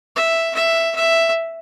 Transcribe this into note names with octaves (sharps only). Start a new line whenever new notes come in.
E5
E5
E5